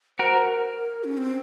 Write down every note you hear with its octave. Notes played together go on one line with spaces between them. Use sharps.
F#4 A#4 C5
C5
A#4
C#4
C4